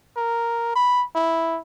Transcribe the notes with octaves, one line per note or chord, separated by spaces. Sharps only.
A#4
B5
E4